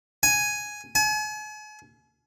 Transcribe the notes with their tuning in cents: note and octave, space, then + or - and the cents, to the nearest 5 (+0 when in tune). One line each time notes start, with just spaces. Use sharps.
G#5 +5
G#5 +40